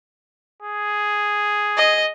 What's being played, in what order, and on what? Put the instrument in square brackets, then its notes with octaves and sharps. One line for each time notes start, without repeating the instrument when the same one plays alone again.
[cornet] G#4
[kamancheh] D#5